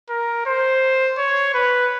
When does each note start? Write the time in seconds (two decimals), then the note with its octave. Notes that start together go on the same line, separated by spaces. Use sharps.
0.10 A#4
0.46 C5
1.17 C#5
1.54 B4